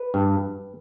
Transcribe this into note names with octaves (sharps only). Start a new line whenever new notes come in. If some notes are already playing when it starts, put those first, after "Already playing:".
Already playing: B4
G2